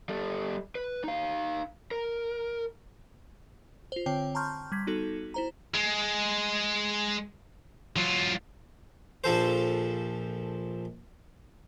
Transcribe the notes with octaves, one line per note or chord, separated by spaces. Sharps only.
G3 A4
B4
D#4 F5
A#4
F4 C5
D3 C4 C#5 G5
A5 A#5 C6 C#6 F6 G6
G3 G#6 B6
B3 D#4 F#4 A4
E4 C5 A#5
G#3
F#3 F4
A#1 F3 A4 C5